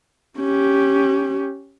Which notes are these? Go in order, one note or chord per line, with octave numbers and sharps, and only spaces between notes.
C#4 G4